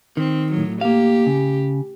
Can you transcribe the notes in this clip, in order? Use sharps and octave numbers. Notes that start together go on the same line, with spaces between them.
D#3 C4
A2 F#3
A#3 G4 F5
C#3